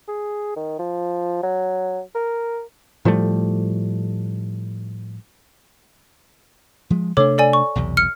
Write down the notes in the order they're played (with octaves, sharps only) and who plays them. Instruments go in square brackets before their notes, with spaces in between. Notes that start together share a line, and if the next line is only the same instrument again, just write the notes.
[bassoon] G#4
D#3
F3
F#3
A#4
[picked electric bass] A2 F3 G3 A3
[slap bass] F3 G#3
[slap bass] C3 A3 D4 [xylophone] A4 C#5 D6
[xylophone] A4 D5 G#5
C#6
[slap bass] B1 E2 C3
[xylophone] F6 C#7